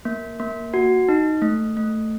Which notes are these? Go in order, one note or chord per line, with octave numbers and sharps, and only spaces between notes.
A#3
A#3
F#4
D#4
A3
A3